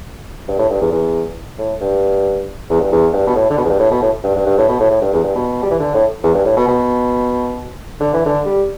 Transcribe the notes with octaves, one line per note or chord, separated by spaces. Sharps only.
G2
A2
G2
E2
E2
A2
G2
E2
G2
E2
G2
B2
A2
D3
B2
E2
G2
A2
B2
A2
G2
G2
G2
A2
B2
A2
A2
G2
E2
G2
B2
G3
E3
D3
A2
E2
G2
A2
B2
B2
D3
E3
D3
G3